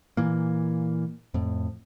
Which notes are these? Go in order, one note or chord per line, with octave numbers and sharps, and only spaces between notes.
A#2 E3 A#3
F2 A2